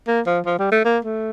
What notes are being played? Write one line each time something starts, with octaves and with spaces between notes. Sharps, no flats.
A#3
F3
F3
G3
A3
A#3
A3